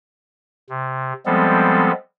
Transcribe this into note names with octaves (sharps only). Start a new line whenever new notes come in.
C3
F3 G3 G#3 B3 C4 A4